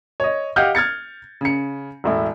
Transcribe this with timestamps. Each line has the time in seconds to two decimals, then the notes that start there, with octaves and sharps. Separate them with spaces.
0.20 C#5 D#5
0.56 G4 D#5 F5 F#5 F6 G6
0.75 F6 G#6 A6 C#7
1.41 C#3 C#7
2.04 E1 A2 E4